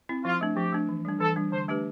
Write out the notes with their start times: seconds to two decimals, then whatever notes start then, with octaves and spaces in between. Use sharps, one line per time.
0.09 C4 E4
0.25 F3 F4
0.41 A3 D4
0.56 F3 G4
0.72 A3 D4
0.89 E3
1.05 G3 D4
1.20 E3 A4
1.36 G3 D4
1.52 D3 C5
1.68 A3 D4 G4 B4